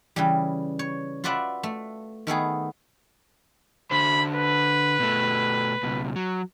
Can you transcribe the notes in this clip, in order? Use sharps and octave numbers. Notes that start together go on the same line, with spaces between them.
C#3 E3 G3
C#5
F4 F#4 B4 D5 E5
A3
D#3 A3 B3 G#4
D3 C5 B5
B4
B2 A3
C#2 B2
F#3